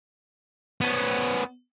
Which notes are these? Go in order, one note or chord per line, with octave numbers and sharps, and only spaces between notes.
B3 C#4